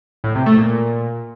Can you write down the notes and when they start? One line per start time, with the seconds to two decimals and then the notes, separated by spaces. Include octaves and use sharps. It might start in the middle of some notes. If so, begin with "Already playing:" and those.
0.24 A2
0.35 C3
0.46 A3
0.57 A#2